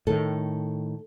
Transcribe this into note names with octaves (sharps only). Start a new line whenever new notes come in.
A2 D#3 A4